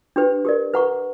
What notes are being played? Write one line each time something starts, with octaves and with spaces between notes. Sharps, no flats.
D4 G4 B4
G4 A#4 D5
B4 F#5 A#5 C#6